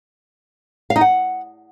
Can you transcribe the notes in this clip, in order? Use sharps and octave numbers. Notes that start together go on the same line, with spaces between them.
F5
D#4
F#5